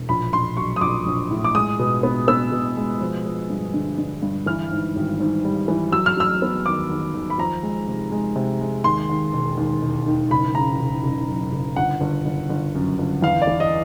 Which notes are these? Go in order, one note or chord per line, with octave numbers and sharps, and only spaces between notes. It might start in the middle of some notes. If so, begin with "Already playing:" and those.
Already playing: E1
A#1 B5
A#1 C6
F#3 C#6
D#6
A#1 D6
A#1
A2
D6
G#3 D#6
B2
B3
B3 E6
B2
G#3
F3
F3
G2
D3
D3
G2
E3 F6
G#2
G#1
G#2
G3
E3
F#3 E6
F6
F#3 E6
B3
D#2 D6
D#2
D#2
B5
F3 A#5
G#3
C3
G#3
C3
G#3
D#2 C6
D#2
E1
D#2
E1
D#3
F#1 B5
C#3 A#5
F#1
F#1
F#2
F#1
G1 F#5
G1
G1
G1
F#2
G1
E2 F5
D5
E3
D#5